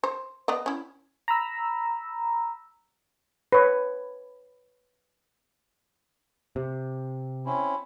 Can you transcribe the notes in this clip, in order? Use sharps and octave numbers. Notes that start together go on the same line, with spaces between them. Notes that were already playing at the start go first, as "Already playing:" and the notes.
C5
B3 D5 D#5
C#4 E4
A#5 B5 E6
B4 C#5
C3
C4 C#4 E4